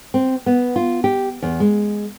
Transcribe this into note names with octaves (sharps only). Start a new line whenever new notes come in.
C4
B3
F4
G4
E2
G#3